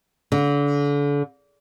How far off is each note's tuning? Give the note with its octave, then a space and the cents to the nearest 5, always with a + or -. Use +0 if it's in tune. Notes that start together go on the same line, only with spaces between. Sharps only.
D3 -35